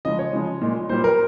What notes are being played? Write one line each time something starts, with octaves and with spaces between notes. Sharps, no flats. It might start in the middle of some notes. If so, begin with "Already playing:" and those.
C#3 F3 G#3 D#5
C#5
C#3 F3 G#3
A#2 G#3
A#2 G3 C5
A#4